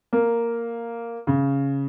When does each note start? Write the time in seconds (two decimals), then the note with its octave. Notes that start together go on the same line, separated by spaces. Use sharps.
0.13 A#3
1.27 C#3